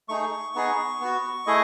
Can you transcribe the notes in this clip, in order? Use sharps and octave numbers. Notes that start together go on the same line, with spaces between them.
A3 D#4 G#4 C#6
B3 D#4 G#4
B3 F#4
A3 E4 G#4 D#5